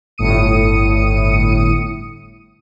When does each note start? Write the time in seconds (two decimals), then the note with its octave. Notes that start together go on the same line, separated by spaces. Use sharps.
0.18 G1 A2 D#6 C#7 D#7